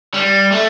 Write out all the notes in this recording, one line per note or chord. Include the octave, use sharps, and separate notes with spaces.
G3
A3